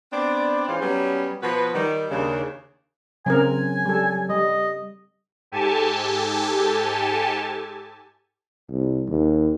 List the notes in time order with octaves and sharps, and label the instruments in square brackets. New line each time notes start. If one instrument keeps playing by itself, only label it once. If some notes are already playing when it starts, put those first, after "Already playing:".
[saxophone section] B3 C4 D4 D5
G#2 E3 C#4 F4 C5 F5
F#3 G3 B3 C#4
B2 F3 B3 F#4 B4
D#3 G3
D#2 C#3 D4
[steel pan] C#3 C4 A#4 [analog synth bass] F#3 [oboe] G#5
[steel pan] G3 A4
[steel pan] G3 [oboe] D#5
[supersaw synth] G#2 G4 A4 G#5 A5
[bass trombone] C2
D#2